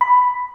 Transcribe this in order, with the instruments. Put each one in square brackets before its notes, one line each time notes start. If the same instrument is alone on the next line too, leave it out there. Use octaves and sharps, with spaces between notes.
[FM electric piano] B5